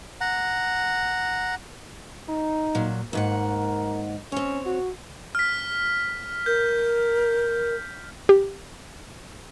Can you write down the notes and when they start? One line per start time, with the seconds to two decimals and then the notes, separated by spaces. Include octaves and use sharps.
0.21 F#5 A#5
2.28 D#4
2.75 A#2 F#3
3.13 D#2 G#2 A#4 F#5
4.32 C4 C#4 C#5
4.66 F#4
5.35 F6 B6
6.46 A#4 G6
8.29 G4